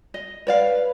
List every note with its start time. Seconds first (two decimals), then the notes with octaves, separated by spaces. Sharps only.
0.14 D#5
0.47 B4 C#5 D5 F5